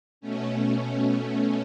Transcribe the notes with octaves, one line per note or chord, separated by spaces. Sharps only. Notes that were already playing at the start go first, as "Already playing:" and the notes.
B2 A3 C#4